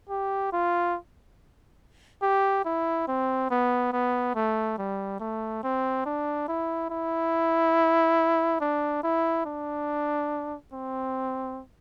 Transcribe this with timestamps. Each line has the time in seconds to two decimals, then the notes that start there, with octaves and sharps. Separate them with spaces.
0.09 G4
0.53 F4
2.22 G4
2.65 E4
3.08 C4
3.51 B3
3.93 B3
4.35 A3
4.78 G3
5.20 A3
5.63 C4
6.05 D4
6.48 E4
6.90 E4
8.60 D4
9.03 E4
9.45 D4
10.73 C4